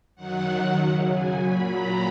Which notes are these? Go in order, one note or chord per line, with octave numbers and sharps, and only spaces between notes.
F#2 D#3 F#3 F#5
F#2 C#3 F#3
G#5
A#2 F#3 B5
A#5